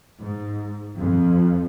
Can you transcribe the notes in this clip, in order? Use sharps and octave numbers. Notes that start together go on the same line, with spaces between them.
G#2
F2